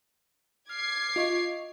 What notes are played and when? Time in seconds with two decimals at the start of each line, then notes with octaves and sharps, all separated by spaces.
0.69 D6 F6 G#6 C7
1.16 F4 D#5 C#6